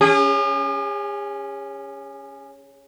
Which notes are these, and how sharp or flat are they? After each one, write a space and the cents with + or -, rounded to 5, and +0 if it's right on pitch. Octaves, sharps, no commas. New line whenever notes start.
C#4 +0 G#4 -45